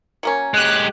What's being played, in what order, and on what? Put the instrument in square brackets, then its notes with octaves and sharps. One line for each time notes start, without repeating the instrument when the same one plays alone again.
[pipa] F#3 A#3 C#4
[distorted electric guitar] G#3 G4 [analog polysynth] F#6